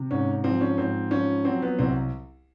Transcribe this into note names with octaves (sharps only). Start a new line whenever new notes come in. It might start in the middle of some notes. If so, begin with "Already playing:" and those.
Already playing: C3
G#2 C#4
F3 C4
C#4
G#2 C4
F3 C#4
F#3 C4
B3
C2 C4